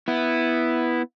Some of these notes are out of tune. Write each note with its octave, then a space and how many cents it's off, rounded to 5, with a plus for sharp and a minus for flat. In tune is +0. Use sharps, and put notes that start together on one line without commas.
B3 +0 E4 +0